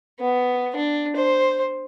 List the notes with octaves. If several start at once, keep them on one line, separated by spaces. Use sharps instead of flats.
B3
D4
C5